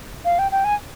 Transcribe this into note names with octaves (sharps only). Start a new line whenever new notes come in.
F5
G5
G5
G#5